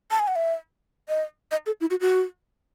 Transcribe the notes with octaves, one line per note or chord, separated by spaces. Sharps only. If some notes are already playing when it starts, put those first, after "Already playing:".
A5
G#5
F#5
E5
D#5
D#5
A4
E4
F#4
F#4